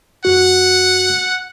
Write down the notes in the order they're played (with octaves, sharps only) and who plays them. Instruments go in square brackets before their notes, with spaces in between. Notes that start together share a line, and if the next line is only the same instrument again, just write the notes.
[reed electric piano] F#2 F#4 [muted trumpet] F#5